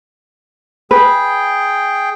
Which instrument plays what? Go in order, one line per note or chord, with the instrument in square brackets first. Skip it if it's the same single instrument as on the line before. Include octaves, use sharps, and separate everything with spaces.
[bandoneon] G#4 G5 [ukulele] B4